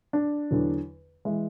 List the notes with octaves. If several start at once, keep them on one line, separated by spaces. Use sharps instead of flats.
D4
E2 D3 F#3
E3 G#3